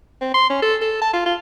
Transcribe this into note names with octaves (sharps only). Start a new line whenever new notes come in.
C4
C6
C#4
A4
A4
A5
F4
F4